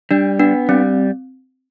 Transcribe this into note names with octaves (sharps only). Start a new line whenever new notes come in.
G3 D4
B3 D4
G3 C4